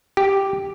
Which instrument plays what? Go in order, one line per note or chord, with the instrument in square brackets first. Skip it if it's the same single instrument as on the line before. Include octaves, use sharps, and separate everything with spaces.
[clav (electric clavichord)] G4